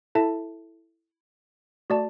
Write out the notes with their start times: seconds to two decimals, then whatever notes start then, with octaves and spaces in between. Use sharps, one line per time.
0.15 E4 A4 E5 A5
1.90 A3 F#4 D5 A5